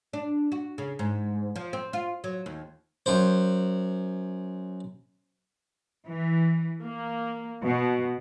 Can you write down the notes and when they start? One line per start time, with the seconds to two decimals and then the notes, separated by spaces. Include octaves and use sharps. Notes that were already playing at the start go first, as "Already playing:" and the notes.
0.13 D4
0.52 F#4
0.78 C#3
0.99 G#2
1.56 F3
1.73 C4
1.93 F4
2.24 F#3
2.46 D#2
3.06 F#2 C5
6.06 E3
6.83 A#3
7.63 B2